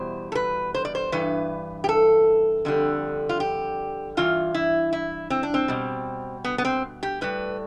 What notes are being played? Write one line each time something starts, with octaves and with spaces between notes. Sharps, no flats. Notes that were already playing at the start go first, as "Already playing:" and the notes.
Already playing: E2 B2 G3 C5
A4
B4
C5
D5
C5
G2 E3 B4
G4
A4
F2 D3 G3
F4
G4
G2 E3 F4
E4
E4
C4
D4
C4
B2 G3
B3
B3
C4
G4
A2 G3 B4